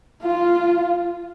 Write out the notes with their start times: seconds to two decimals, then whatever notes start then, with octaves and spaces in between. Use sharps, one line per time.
0.22 F4